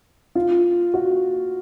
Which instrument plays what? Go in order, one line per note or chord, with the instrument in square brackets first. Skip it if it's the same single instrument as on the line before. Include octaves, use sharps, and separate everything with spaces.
[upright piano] F4
F#4